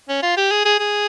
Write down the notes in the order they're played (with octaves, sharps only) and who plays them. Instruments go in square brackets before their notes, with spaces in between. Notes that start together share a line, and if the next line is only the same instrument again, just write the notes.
[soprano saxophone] C#4
F4
G4
G#4
G#4
G#4